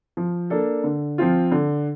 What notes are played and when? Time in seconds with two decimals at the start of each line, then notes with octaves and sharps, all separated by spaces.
0.17 F3
0.50 A#3 D4 A4
0.84 D3
1.18 F3 C4 F4
1.52 D3